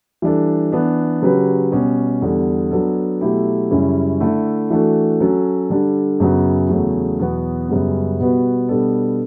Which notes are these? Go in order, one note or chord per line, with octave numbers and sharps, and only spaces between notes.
E3 G3 D4 A4
E3 B3 D4
C#3 F#3 C#4 G4 B4
B2 G3 C#4 G4
E2 D3 G3
F#3 B3 D4 A4
B2 F#3 A3 E4 G4
F#2 C#3 G3 C#4 E4
D3 A3 E4 A4
E3 A3 D4 F#4 A4
F#3 C#4 F#4 A4
D3 G3 D4 A4
F#2 C#3 F#3 B3
E2 C#3 F#3 A3
E2 B2 F#3 B3 F#4
F#2 C#3 G3 B3
B2 G3 B3 F#4 B4
B2 G3 B3 D4 A4